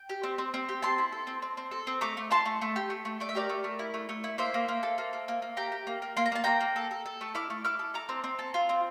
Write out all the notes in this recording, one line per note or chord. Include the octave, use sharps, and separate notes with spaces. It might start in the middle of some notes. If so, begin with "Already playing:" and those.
Already playing: G5
G4
C4
C4
C4
G4
C4 A5 C6
E4
A4
C4
C4
C4
A4
C4
A3 A#5 D6
A3
E4 A5 C6
A3
A3
G4
A3
A3
A3 D5
E5
G4 A#4 D5
A3
A3
E4
A3
A3
E4
A#3 C5 E5
A#3
A#3
A4
A#3
A#3
A#3
A#3
G4 G5 A#5
G4
A#3
A#3
A#3 C6
A#5
A#3 A5
A#3 G5 A#5
A#3
A4
A4
A4
A3
E4 D6 F6
A3
E4 D6 F6
A4
A4 A#5 D6
C4
C4
A4
F4
C4